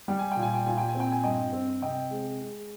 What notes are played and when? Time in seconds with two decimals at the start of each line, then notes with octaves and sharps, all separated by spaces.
0.08 G3 G5
0.19 G#5
0.32 A#2 G5
0.42 G#5
0.54 G5
0.66 A#2 G#5
0.78 G5
0.89 G#5
0.95 C4
1.00 G5
1.12 G#5
1.24 G2 D#5 G5
1.53 C4
1.82 C3 D#5 G5
2.11 G#3
2.41 G#3